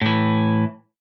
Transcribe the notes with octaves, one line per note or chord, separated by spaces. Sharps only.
A2 E3